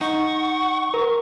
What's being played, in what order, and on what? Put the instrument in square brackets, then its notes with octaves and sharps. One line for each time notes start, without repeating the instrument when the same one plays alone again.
[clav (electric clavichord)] D#4 [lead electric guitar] F#5 [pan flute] C#6
[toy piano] A#4 [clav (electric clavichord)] A#5